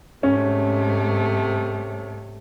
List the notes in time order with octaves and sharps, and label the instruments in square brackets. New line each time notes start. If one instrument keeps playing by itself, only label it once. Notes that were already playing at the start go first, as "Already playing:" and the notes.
[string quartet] G#2 C3 A3 [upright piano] C#4